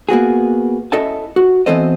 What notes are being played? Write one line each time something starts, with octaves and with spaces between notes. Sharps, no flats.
A#3 B3 F#4 G#4
C#4 E4 A4 D#5 E5 A5
F#4
E3 B3 C4 A4 C5 D#5